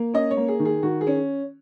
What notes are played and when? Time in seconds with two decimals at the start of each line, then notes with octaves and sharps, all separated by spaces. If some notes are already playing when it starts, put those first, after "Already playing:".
Already playing: A#3
0.14 C#4 D#5
0.31 C#5
0.37 A#3
0.48 G#4
0.60 D#3
0.65 G#4
0.83 D#3 F#4
1.01 G#4
1.07 C#4